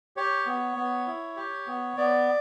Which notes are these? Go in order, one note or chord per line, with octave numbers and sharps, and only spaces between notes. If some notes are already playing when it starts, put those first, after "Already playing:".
G4 C#5
B3
B3
E4
G4
B3
B3 D5